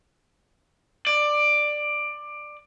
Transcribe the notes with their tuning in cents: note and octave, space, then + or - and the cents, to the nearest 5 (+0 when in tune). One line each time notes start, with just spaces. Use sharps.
D5 +15